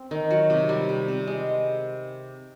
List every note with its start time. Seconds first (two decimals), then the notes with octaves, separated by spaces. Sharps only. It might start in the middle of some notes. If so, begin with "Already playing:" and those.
Already playing: C4
0.11 D#3
0.31 F#3
0.50 C3
0.69 G3
0.89 C3
1.08 C3
1.27 G#3